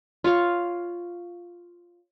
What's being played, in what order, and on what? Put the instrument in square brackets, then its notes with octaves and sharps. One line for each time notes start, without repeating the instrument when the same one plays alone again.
[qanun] F4 C#5 F5 C#6